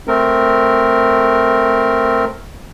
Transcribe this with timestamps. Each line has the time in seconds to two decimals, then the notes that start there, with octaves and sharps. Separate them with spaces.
0.08 A3 C4 A#4